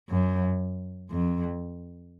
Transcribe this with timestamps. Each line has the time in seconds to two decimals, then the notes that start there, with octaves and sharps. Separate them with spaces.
0.09 F#2
1.11 F2